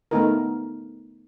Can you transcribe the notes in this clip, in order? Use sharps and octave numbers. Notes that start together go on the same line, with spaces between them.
A3 B3 D#4 A#4